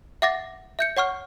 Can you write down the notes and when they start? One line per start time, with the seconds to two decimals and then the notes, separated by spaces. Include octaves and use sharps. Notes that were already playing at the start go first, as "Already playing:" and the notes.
0.22 E5 F#5 D6 A6 A#6
0.79 E5 G6 C#7
0.97 C#5 F#5 C#6 F6